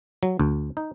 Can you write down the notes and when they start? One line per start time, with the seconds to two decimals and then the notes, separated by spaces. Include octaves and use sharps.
0.23 F#3
0.39 D2
0.77 D#4